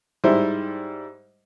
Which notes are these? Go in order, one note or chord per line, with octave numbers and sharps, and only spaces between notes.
G#2 G3 E4 C5